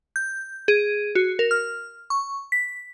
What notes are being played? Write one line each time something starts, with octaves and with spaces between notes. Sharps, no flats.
G6
G#4
F#4
A#4
F6
C#6
B6